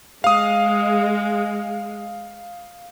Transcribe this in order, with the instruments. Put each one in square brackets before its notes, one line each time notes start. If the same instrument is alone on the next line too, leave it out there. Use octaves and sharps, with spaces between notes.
[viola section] G#3 [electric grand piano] F5 D#6